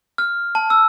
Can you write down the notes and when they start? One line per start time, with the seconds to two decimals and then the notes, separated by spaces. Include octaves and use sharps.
0.18 F6
0.55 A5
0.70 E6